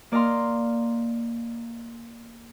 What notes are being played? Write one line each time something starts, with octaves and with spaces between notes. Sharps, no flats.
A#3 D5 D#5 F5 A#5 C6